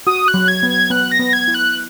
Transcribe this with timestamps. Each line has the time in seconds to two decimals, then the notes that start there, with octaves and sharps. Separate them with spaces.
0.06 F#4 D#6
0.28 F#6
0.34 F#3
0.48 G#6
0.63 B3
0.70 G#6
0.90 B3 F#6
1.12 A#6
1.20 B3
1.33 G#6
1.48 E4
1.55 F#6